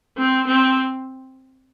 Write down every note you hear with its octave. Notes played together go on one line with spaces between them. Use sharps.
C4
C4